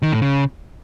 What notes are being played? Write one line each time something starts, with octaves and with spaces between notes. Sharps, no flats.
D#3
A2
C#3